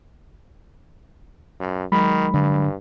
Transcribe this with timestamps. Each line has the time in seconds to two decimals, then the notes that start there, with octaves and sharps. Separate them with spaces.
1.60 F#2
1.92 D#3 F#3 G#3 B5
2.34 G2 D3